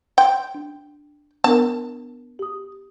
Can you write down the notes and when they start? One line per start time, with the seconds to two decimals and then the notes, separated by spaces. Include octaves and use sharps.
0.18 G5 C6
0.54 D4
1.44 B3 D4 A#4 A5
2.39 G4 D#6